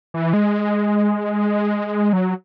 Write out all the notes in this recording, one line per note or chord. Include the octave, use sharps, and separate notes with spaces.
E3
G#3
F#3